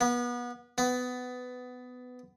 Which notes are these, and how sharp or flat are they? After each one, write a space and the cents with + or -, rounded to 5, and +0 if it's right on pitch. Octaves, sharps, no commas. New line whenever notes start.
B3 -30
B3 +15